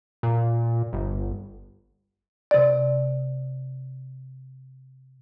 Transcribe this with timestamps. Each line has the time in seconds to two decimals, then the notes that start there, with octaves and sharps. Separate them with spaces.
0.23 A#2
0.93 G1
2.51 C3 D5